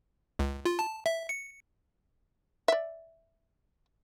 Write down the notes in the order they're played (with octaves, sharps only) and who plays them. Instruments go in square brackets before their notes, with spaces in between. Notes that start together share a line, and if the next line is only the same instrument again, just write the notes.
[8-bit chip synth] C#2
F4
A5
E5
C#7
[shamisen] D5 E5